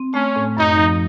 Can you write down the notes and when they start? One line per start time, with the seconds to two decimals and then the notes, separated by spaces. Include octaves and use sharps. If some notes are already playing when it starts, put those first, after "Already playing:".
Already playing: C4
0.14 A3 C#4
0.36 A2
0.57 F#2 D#4
0.78 F3